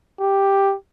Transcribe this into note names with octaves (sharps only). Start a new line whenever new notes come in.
G4